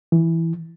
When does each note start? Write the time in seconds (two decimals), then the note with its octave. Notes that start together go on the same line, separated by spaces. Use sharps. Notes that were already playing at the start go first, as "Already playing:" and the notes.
0.12 E3